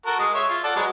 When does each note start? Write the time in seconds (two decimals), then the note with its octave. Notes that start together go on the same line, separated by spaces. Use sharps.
0.06 F#4 A4 A#4
0.19 G#3 D#6
0.35 C#5 E5 C6
0.50 F4
0.64 A4 D5 F#5
0.76 F#3 G#3 B3